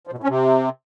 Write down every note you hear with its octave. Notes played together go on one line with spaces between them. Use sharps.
F3
B2
A2
C#4
C3